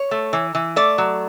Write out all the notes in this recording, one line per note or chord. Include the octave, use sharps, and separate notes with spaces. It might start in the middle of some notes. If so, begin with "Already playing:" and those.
Already playing: C#5
A3
E3
E3
A3 D5
F#3